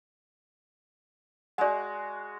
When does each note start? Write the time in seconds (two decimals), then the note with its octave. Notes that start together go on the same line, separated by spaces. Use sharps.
1.58 G#3 F#4 D5 F#5